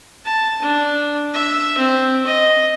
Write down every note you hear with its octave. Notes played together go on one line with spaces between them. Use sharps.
A5
D4
E5
C4
D#5